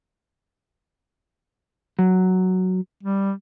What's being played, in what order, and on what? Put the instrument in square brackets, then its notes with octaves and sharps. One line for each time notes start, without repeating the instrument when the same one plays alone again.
[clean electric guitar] F#3
[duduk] G3